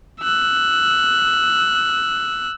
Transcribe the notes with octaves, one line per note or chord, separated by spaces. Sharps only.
E6 F#6